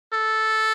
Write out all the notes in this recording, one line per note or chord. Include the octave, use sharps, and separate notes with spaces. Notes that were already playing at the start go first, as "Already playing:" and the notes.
A4